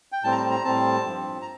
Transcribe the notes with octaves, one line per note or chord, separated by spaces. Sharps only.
G5
A2 G3 C4 A5
A#5
A5
A#5
A2 G3 C4 A5
G2 F3 C4
A#5